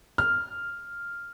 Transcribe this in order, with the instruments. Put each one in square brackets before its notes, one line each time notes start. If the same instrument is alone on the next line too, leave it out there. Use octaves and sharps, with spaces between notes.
[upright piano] F6